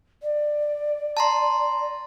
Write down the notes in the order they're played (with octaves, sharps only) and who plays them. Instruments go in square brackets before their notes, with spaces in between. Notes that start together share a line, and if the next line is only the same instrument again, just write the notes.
[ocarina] D5
[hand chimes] A5 A#5 C6